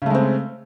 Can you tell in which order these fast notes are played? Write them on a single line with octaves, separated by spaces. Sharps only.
C#3 A3 G#3 C4